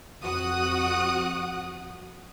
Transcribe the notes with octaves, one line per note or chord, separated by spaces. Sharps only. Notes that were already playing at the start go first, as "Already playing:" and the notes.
F2 F#4 F#5 D#6 F#6